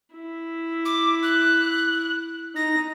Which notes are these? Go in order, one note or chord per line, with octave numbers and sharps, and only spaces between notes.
E4
D6
F#6
D#4 A#6